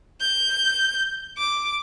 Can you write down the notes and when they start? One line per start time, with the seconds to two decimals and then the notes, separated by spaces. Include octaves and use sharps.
0.21 G6
1.38 D6